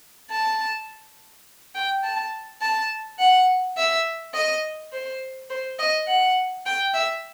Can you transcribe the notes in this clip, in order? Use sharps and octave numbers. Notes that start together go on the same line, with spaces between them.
A5
G5
A5
A5
F#5
E5
D#5
C5
C5
D#5
F#5
G5
E5